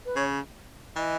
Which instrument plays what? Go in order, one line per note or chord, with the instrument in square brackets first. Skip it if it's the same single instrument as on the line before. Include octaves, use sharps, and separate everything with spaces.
[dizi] B4
[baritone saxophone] C#3 [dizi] C#5
[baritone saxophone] E3 [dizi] D#5